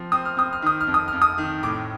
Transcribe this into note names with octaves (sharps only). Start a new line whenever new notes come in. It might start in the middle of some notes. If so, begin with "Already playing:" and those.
Already playing: F3 C4
C4 D#6
F6
C4 D#6
F6
D#3 D#6
F6
F2
D#6
F2 F6
D#6
D#3
A2 D6